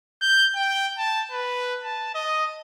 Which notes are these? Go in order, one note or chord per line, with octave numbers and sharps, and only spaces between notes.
G6
G5
A5
B4
A5
D#5